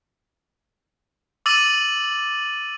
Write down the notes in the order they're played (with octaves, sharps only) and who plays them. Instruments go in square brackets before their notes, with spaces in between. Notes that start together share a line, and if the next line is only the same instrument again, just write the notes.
[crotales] D6 E6 A6 D#7 F#7